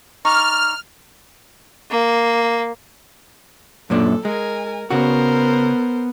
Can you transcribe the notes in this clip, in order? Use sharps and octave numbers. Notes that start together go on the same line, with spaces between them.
D#4 D5 C#6 F6
A#3
F#2 A#2 D4 A4
G#3 A#4 G#5
C#3 B3 F#4 A#4 C5